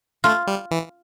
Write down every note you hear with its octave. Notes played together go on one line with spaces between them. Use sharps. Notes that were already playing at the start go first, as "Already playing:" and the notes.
A3 F4
G3
E3